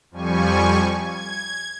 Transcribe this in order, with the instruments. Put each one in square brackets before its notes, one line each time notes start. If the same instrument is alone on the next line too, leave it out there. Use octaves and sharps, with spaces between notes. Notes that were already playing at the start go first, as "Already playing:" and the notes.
[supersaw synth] F2 F3 G3 G#5 C#6
G#6